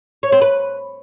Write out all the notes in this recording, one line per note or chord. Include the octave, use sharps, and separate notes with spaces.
C#5
C4
B4